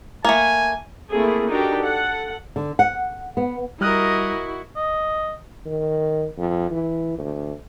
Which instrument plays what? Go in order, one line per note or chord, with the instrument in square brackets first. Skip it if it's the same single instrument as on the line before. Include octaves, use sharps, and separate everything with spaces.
[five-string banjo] A3 A#3 [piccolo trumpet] G#5
[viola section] A3 A#3 C4 E4 G#4 A4
D4 D#4 F#4 G4 A4 A#4
A4 F#5
[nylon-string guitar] D3
F#5
B3
[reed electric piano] G3 F6 F#6 [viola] E4 F#4 [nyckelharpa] A#4 D#5
[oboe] D#5
[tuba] D#3
F2
E3
D2